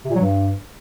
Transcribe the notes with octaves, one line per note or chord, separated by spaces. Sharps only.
C3
A#2
F#3
G2